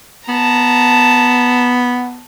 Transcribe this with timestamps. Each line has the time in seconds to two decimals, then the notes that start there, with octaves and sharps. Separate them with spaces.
0.28 B3 A5 A#5